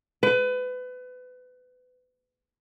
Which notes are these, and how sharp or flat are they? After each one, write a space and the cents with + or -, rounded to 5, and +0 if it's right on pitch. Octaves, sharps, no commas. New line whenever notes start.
B4 +30